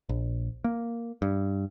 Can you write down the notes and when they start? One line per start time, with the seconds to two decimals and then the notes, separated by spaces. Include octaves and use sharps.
0.09 A#1
0.64 A#3
1.22 G2